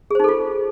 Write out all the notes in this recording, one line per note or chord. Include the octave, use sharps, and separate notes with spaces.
D#4 F4 G#4 A4 C5